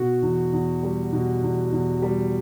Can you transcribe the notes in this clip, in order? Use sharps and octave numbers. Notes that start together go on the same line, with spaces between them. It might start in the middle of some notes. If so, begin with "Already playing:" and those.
Already playing: B2 F#4
E2
E2
G3
B2
E2
E2
G3